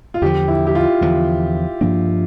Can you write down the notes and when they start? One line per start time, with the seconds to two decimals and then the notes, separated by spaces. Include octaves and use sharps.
0.14 F4
0.22 E2 D3 F3 G4
0.48 E4
0.67 G4
0.75 F4
1.01 E2 D3 F3
1.81 G2 F3 A#3 D4